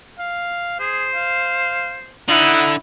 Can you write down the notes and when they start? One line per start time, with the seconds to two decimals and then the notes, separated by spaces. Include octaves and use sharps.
0.19 F5
0.80 G#4 C5
1.15 F5
2.28 D3 D#4 E4 F#5